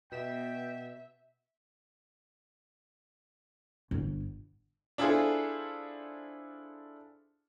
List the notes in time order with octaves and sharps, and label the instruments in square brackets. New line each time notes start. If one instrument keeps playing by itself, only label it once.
[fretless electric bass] B2 [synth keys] B3 B6 E7 [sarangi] E5 [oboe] G5
[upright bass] G1
[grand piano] D4 E4 F4 G#4 A4 C5